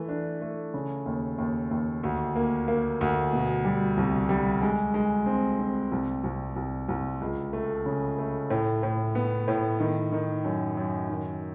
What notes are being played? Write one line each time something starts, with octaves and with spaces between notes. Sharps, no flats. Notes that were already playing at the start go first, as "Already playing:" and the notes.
Already playing: E3 A3
D4
A3
C#3
D#2
D#2
D#2
D2
A#3
A#3
D2
B2
G3
C2
G3
G#3
G#3
C4
C4
C2
C2
C2
C2
C#2
A3
C#3
A3
A2
A2
B3
A2
D#3
D#3
F#2
F#2
D#3